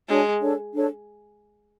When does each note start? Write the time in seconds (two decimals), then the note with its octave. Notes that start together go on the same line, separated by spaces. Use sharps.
0.08 G#3 D4 F#4 C#5 G#5
0.41 D4 A4 C#5
0.74 D4 A4 C#5